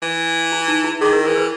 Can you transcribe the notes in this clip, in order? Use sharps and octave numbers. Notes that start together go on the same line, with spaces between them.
E3
E4
D#4
E4
D#3 G#4
A#4
E3 A#4
B4